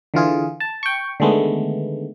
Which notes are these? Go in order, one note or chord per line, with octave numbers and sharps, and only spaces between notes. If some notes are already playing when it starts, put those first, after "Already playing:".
D3 E3 F4 G#4
A5
G5 C#6
D3 D#3 G#3 A3 B3